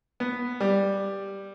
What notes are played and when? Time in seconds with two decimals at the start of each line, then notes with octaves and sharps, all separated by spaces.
0.20 B3
0.60 G3